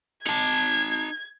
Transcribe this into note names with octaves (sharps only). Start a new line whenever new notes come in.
D#4 A5 G#6